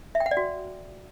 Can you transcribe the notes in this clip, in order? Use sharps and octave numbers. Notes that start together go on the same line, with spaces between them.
E5
G5
F#5
D5
F#4